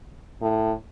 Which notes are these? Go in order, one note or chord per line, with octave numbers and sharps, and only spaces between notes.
A2